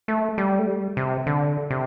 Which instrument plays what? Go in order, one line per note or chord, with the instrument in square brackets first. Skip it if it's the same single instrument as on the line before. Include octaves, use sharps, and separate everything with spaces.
[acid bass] A3
G3
A3
G3
C3
D3
C3